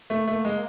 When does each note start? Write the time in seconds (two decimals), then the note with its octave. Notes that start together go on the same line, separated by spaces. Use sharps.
0.10 A3 A#3
0.27 A3
0.45 G#3